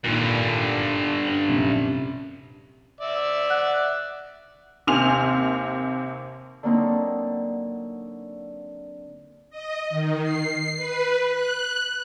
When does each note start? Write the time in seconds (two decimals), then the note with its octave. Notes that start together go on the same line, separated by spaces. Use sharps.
0.04 G#1 G2 A#2 D3
1.27 D4 F#7
1.48 A#1 F#2 C3
3.01 D5 E5
3.50 F#5 F#6
4.87 D#2 C3 G#5 C6 F6 F7
6.63 D3 F#3 A#3 C4 D#4
9.50 D#5
9.90 D#3
10.22 C7
10.77 B4
11.30 F#6